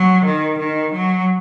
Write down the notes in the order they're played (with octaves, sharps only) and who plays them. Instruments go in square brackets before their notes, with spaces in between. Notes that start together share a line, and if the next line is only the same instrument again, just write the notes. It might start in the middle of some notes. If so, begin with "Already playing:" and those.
Already playing: [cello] F#3
D#3
D#3
F#3